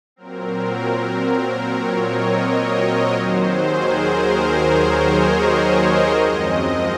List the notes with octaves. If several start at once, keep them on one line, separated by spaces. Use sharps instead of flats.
A#2 F#3 C4 A#4
C#5
D#5
D#5
D#2 D#3 F#3 C5
G#4
A#4
C#5
D#5
D#5
F#2 F3 G#3 C4